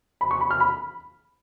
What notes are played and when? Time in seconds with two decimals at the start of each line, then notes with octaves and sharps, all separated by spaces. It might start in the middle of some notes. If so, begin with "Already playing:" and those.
0.21 B5
0.31 C#6
0.41 B5
0.51 F6
0.60 B5